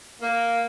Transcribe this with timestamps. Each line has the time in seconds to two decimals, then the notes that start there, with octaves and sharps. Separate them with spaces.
0.21 A#3